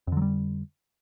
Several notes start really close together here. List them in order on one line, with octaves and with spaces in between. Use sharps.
F2 D3 F#3 G3